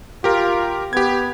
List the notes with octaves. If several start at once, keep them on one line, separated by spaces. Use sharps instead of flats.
F4 G4 A#4
B3 G4 G#6